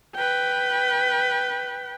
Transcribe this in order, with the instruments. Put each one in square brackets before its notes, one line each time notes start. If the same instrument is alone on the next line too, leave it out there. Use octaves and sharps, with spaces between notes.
[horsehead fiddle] B4 G5